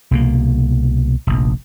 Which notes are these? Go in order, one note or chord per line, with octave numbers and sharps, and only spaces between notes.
C2 B2 A#3
F1 A#1